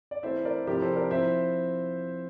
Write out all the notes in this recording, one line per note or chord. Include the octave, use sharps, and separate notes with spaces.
D5
E3 A3 C4 E4 C5 E5
A#4 D5
C3 F3 C4 E4 G4 A#4
A4 C5
A#4 D5
F3 C4 E4 C5 E5